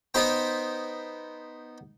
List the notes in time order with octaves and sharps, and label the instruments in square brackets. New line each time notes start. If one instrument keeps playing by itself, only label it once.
[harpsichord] B3 D#4 C5 G5